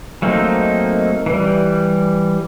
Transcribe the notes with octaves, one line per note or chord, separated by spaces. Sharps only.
F#3 A3 A#3 C4 D#4
E3 G3